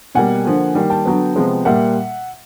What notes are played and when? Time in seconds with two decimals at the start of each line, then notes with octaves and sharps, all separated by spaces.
0.15 B2 G3 A#3 F#5 G#5
0.45 D3 F3 A#3
0.75 D#3 G3 A#3
0.90 G5 A5
1.06 D3 F#3 B3
1.36 C3 F3 G#3 B3
1.65 A#2 G3 A#3 E5 F#5